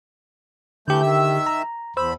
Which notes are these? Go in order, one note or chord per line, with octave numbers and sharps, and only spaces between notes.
D3 E3 A3 G4 G6
D#3 E5 E6
A#5
E2 C5 B5 E6